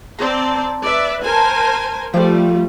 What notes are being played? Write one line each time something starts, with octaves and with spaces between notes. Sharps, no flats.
C4 C5 D5 A5 A#5
B4 D5 E5
A#4 C5 G#5 A5
F3 G3 A3 D5 G5